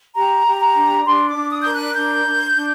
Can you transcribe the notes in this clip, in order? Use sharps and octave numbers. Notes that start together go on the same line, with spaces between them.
G4 A#5
G4
A#5
D4
D4 C6
D6
D4
D#6
A#4 G6
F#6
D4 G6
D4
D4